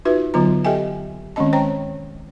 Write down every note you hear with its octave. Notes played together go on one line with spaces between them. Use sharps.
D#4 F4 F#4 B4 E5
D3 F#3 B3 F4 A#5
G4 A4 D#5 E5 G5 G#5
D#3 G#3 C4 C#4 D#5 A5
C5 C#5 G5 A#5